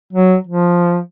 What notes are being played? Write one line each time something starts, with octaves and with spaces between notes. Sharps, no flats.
F#3
F3